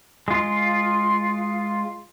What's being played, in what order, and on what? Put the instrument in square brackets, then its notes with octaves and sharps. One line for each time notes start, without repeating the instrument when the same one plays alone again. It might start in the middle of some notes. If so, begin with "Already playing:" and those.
[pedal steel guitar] G#3 F4